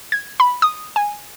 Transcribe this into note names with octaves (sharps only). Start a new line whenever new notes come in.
G#6
B5
D#6
G#5